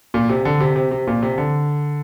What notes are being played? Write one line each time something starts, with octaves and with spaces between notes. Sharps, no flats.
A#2
C3
D3
C3
C3
C3
A#2
C3
D3